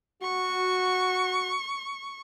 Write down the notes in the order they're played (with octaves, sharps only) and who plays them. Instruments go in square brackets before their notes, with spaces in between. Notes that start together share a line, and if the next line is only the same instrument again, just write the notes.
[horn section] F#4 [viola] C#6